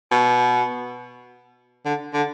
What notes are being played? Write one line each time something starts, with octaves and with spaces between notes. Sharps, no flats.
B2
D3
D3